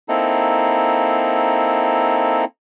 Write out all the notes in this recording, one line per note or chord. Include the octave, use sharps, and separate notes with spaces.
A#3 C4 D#4 E4 A4